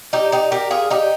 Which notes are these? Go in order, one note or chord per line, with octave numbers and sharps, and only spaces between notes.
D#4 G4
D#4 G4
G4 A#4
F4 G#4
D#4 G4